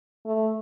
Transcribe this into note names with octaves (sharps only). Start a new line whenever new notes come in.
A3